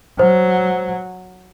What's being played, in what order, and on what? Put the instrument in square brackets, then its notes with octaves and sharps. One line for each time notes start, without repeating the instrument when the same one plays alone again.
[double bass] F#3 [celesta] C5